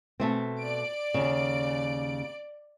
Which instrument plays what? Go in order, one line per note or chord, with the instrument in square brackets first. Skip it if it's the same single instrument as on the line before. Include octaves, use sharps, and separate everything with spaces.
[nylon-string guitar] B2 A3 C4
[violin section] D5 D7
[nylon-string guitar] D#2 C#3